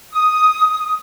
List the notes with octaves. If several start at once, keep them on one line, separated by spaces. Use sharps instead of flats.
D#6